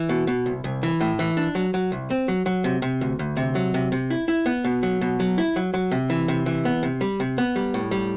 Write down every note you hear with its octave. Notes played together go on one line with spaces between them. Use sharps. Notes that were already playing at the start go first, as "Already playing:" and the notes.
Already playing: E3
B2
B2
C2
C2
E3
A2
E3
D4
F#3
F#3
C2
C4
F#3
F#3
C3
C3
D2
D2
C3
F#3
C3
C3
E4
E4
B3
B2
F#3
B2
F#3
E4
F#3
F#3
C3
E3
C3
E3
B3
C3
G3
C3
B3
G3
A2
G3